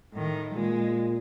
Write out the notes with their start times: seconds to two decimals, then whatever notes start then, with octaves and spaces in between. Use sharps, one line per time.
0.13 A2 D#3
0.55 A#2 G#3